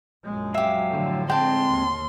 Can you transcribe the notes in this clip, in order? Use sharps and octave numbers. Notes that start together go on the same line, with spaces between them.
A#1 F#2 G#3
F#3 G4 E5 F5 E6
A2 D3 F3
G#3 C4 G5 A5 C6
D#2